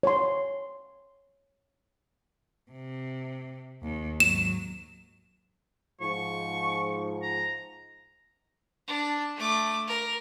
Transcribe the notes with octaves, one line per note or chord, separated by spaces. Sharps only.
C#5 C6
C3
D#2
G#2 F#3 E7
G#2 F3 C#6
A#5
D4
A3 D6
A#4